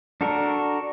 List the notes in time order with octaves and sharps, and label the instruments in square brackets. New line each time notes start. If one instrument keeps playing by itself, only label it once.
[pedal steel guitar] D4 F#4 A4 A#4